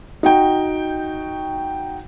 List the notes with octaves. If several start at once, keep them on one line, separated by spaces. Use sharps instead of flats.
D#4 F#4 G5